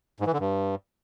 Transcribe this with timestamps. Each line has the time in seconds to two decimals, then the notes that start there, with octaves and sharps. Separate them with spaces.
0.20 G#2
0.27 E3
0.33 D3
0.40 G2